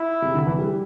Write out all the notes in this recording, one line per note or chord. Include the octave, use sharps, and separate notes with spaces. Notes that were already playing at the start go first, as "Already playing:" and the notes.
Already playing: E4
C3
D3
E3
G3